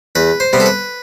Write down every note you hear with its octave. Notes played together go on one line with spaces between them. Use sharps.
E2 B4
C5
C3 G3 B3
A4
B4